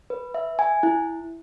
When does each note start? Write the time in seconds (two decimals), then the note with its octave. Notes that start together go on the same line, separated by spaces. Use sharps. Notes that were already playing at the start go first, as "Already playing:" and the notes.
0.10 B4
0.34 E5
0.59 G#5
0.83 E4